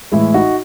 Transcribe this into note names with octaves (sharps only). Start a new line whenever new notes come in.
A2 E3 G#3 E4
D#4 F#4